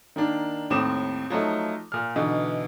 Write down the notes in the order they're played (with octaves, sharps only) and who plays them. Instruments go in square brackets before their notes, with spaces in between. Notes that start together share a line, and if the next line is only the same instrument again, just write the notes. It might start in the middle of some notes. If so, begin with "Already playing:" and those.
[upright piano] D#3 A#3 D4
D#2 A2 C4 D6 D#6 E7
F3 F#3 A3 D#4
A#2 F6
B2 D3 E3 D#4